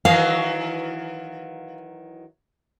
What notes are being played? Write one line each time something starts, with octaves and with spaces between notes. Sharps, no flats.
D#3 E3 F#3 F5